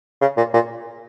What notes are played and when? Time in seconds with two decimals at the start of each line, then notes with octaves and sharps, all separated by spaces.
0.21 C#3
0.37 A#2
0.54 A#2